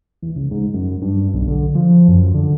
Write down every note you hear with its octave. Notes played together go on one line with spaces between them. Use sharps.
E2
C#2
G#2
F#2
G2
B1
D3
F3
F#2
D3